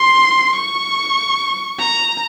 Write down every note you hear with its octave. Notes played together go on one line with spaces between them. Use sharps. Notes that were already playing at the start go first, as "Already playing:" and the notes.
Already playing: C6
C#6
A#5